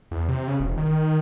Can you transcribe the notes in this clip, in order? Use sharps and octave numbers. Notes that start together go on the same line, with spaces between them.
E2
C3
C#3
E1
D#3
D#3